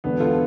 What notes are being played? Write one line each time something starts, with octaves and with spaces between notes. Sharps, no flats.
E1 E2 D3 B3
F4 A4